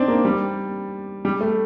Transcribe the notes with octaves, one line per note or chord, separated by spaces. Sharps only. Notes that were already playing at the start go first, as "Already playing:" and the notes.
Already playing: C4 D4 D#4
A#3
G3
G3
A3